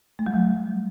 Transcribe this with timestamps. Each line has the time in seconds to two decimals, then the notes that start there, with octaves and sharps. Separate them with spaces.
0.19 A3
0.26 G3
0.34 F#3